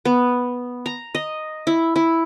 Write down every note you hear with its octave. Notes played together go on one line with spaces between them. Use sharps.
B3
A#5
D#5
E4
E4